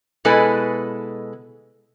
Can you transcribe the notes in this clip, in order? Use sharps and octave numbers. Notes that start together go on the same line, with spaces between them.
B2 G#3 E4 A4 B4 G#5